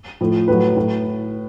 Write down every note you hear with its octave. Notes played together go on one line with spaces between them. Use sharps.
A2 F3
A2 F#3 B4
A2 F#3